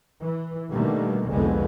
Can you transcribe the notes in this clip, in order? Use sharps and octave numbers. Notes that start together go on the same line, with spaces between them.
E3
B2 D3 D#3 G3 A3 A#3
F1 C2 F2 D3 G#3 B3